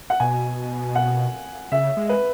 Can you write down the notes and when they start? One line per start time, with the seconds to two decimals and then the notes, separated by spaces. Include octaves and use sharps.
0.10 F#5
0.20 B2 G#5
0.95 F#5
1.72 C#3 E5
1.97 G#3
2.09 B4